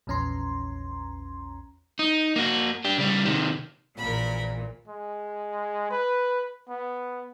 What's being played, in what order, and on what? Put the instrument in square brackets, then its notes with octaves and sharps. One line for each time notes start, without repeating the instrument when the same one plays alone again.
[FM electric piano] A#1 E2 C#4 A#5 C6
[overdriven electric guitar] D#4
A#3 F#4
D4 G4
C#3 G3
C3 D#3
[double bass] A#1 [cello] A#2 E3 [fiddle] A#4 B5
[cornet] G#3
B4
B3